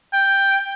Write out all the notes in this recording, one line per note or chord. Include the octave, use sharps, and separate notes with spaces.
G5